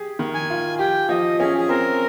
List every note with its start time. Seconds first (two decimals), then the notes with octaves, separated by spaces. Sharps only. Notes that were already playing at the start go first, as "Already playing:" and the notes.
Already playing: G4 G#4
0.19 D#3
0.34 G#5
0.50 F4
0.79 G4 G5
1.09 F3 D#5
1.39 C#4 G#4
1.58 G#4
1.69 C4 A#4